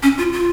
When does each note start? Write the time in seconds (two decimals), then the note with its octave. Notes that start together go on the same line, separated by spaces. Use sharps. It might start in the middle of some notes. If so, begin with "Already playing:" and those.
0.03 C#4
0.18 F4
0.33 F4